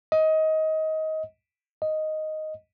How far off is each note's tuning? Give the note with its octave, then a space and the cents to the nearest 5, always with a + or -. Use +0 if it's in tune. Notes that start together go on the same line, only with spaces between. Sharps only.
D#5 +20
D#5 +0